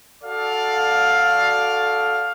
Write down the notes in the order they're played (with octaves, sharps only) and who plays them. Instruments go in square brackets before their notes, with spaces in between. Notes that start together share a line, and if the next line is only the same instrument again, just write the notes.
[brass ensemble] F#4 A4 D5 F5